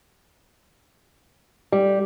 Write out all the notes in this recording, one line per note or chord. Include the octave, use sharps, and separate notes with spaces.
G3